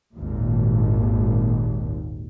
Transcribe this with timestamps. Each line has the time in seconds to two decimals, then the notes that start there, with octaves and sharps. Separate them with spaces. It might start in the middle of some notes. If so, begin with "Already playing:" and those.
0.15 G#1 D#2 A#2